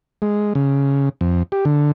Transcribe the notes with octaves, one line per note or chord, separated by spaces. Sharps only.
G#3
C#3
F2
G4
D3